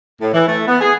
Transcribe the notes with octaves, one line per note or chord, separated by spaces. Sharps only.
A2
E3
A3
B3
G#4